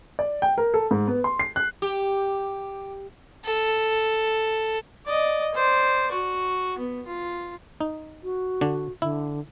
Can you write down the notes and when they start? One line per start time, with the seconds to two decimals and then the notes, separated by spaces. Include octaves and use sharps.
0.19 D5
0.42 G5
0.58 A#4
0.74 A4
0.91 G#2
1.08 B3
1.24 C6
1.39 C7
1.56 F#6
1.82 G4
3.45 A4
5.06 D5 D#5
5.55 C5 D5
6.12 F#4
6.78 B3
7.07 F4
7.81 D#4
8.24 F#4
8.61 D3 D4
9.02 D3 E4